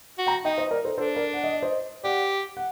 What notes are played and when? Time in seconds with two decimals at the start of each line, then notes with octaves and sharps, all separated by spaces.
0.18 F#4
0.27 G5 A#5
0.45 D#4 D#5 G5
0.58 C5 D#5
0.71 A#4 D5
0.85 A4 C5
0.98 D4 A4 C5
1.15 A#4 D5
1.34 F#5
1.44 D#5
1.53 D5
1.62 C5 D#5
2.04 G4 D5 F#5
2.57 F#5